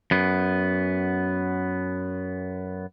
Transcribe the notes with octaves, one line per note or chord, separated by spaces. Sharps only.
F#2 B3